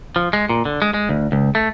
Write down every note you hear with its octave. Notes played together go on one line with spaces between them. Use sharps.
F3
G#3
A#2
D3
G#3
G#3
D2
C#2
A3